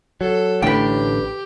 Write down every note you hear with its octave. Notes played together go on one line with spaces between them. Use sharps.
F#3 A4
A1 A2 D3 G4 B4 G5